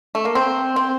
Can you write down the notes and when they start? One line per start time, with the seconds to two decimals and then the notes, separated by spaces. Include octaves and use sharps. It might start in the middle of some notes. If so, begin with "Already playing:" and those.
0.15 A3
0.25 A#3
0.35 C4
0.76 C4